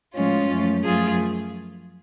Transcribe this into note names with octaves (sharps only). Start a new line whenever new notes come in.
A2 F3 G#3 C#4 F4
F#2 F3 A3
F#2 F3 A3 F4 G#4